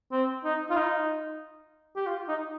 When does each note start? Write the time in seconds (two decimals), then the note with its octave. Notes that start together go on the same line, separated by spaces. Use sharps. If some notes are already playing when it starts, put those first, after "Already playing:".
0.12 C4
0.44 D#4
0.70 F4
0.76 D#4
1.96 G4
2.06 F4
2.28 D#4